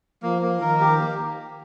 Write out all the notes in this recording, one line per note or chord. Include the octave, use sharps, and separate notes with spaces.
F3 A#3
A#3
D#3 A#4
G4
A#3